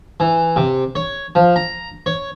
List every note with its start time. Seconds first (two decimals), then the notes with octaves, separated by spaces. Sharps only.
0.20 E3
0.56 C3
0.95 C#5
1.35 F3
1.56 A#5
2.06 C#5